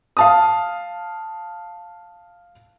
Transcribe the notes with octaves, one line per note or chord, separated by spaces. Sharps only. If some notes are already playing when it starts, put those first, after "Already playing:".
F5 A5 D#6